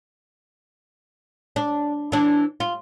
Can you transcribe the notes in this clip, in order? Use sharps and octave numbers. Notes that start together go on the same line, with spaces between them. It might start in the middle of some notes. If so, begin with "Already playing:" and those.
D4
E3 D4
F4